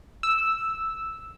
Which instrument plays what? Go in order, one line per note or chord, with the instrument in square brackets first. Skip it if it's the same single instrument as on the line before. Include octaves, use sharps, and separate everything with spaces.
[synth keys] E6